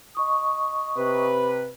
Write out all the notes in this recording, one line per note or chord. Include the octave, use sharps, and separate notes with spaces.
D#5 C#6 D#6
C3 B4